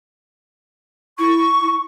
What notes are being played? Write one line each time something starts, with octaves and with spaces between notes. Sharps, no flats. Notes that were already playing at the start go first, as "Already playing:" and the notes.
E4 C#6